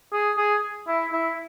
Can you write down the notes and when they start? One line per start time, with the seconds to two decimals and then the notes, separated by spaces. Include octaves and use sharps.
0.13 G#4
0.38 G#4
0.87 E4
1.12 E4